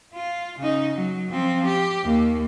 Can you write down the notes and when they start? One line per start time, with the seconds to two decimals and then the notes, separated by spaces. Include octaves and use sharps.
0.14 F4
0.59 C#3 D#4
0.95 F#3
1.29 F3 C4
1.66 G4
2.04 D#2 A#3